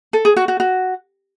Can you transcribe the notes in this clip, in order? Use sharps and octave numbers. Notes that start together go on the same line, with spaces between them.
A4
G#4
F#4
F#4
F#4